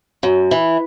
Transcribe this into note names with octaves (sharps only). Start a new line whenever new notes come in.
F#2
E3